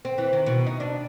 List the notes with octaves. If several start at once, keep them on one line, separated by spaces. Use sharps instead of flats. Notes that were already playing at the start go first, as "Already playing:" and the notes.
C4
E3
D#3
B2
D#4
D4